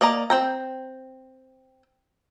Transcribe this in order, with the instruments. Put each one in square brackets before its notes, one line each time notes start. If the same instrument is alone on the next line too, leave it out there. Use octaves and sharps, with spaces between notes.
[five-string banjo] A#3 D5 D#5 A#5
C4 G5 A#5